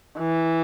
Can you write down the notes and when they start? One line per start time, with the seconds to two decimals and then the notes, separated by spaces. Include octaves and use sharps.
0.19 E3